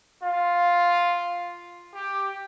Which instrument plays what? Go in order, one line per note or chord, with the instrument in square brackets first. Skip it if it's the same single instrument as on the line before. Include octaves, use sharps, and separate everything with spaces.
[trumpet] F4
G4